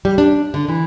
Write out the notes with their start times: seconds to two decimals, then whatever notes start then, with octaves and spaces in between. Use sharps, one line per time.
0.05 G3
0.18 D4
0.54 D3
0.68 E3